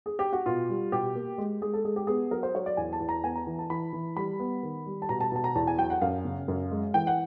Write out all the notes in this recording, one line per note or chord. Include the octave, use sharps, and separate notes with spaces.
G#4
G4
F#4
B2 F4
G3
B2 G4
A#3
G#3
G#3 G#4
A4
G#3 G#4
G4
B3 G#4
F#3 A#4
C5
F#3 C#5
D5
E2 G#5
A5
E2
A#5
B3 G#5
A#5
E3
A5
E3 B5
E3
G3 B5
B3
D#3
G3
A5
B2 A#5
A5
B2 A5
A#5
E2 A5
G#5
F#3 G5
F#5
F#2 F5
C#3
F#2
G#3
E3 G5
F#5